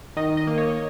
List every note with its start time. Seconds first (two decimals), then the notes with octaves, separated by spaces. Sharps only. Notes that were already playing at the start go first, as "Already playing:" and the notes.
0.16 D#3 D#5
0.37 D#5
0.47 A#3
0.58 C#5